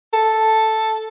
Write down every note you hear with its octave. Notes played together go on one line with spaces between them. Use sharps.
A4